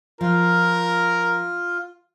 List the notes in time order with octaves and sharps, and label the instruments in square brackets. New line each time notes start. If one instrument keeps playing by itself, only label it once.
[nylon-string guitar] F3 [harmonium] F4 [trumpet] A#4